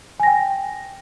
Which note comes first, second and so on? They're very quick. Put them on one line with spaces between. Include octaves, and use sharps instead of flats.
G#5 A#6 G5